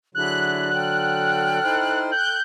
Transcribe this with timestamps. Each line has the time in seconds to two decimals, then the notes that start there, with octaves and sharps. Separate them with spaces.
0.15 D3 F#3 D4 E4 G#4 F#6
0.74 A4 G5 F6
1.64 D#4 E4 C5
2.11 F#6 G6